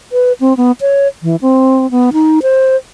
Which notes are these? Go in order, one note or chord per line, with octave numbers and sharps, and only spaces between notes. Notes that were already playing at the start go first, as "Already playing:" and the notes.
B4
C4
B3
C#5
E3
C4
B3
D#4
C5